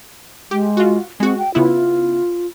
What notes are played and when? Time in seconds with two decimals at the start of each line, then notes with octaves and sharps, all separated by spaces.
0.51 G#3 G4
0.77 F4 F#4
1.20 G#3 C4 F#4
1.38 G5
1.55 C#3 B3 E4 F4